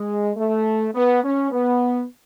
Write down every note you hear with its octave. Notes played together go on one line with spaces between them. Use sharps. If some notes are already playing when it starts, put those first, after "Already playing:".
Already playing: G#3
A3
B3
C#4
B3